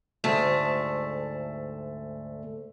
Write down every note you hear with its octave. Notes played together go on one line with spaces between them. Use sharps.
D2 G#2 A3 A5